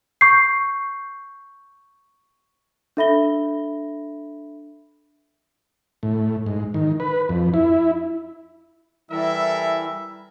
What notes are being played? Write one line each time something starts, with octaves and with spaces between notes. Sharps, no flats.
C#6 G6 C7
D4 A4 E5 B5 A#6 G7
A2
G#2
D#3
B4
F2
E4
E3 G3 E4 A4 A#4 E5